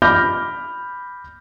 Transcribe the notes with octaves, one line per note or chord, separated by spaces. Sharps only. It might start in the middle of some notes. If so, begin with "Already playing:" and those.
B5 D6 F6 G6 A#6